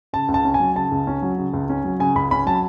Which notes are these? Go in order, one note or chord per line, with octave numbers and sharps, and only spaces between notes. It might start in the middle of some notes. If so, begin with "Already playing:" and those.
C#3 A5
C#2
A5
C#4
G#5
F#3
C#3 A5
C#2
C#4
F#3
C#3
C#2
C#4
F#3
C#3 G#5
C#2 B5
C#4 B5
F#3 A5